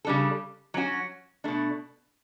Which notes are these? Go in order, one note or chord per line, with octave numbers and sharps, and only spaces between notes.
C#3 G3 D4 A4
F#3 C#4 F#4
B2 A3 D4